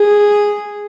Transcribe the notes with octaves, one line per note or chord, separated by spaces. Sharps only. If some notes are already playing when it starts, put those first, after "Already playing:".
Already playing: G#4